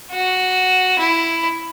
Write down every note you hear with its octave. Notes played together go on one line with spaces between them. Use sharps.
F#4
E4